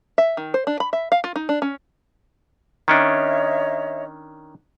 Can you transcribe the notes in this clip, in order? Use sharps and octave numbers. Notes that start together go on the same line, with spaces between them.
E5
D#3
C5
D4
B5
E5
F5
F4
D#4
D4
C#4
D#3 C#4 D4 C#5 D#5 E5